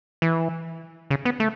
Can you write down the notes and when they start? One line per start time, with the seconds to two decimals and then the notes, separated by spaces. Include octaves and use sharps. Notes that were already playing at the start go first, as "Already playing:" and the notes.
0.22 E3
1.10 C#3
1.25 B3
1.40 A3